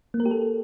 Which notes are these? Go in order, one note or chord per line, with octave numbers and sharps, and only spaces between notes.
A#3
A#4
G4
A4